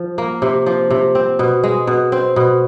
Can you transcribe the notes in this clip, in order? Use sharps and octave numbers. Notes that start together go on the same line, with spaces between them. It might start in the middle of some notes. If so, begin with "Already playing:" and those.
Already playing: F3
A#3
C3
F3
C3
C4
B2
G#3
B2
C4
B2